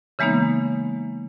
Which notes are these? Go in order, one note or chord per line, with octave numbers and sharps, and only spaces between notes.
C#3 E3 G#3 A#3 B3 D#4